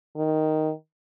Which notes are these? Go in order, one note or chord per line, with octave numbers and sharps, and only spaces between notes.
D#3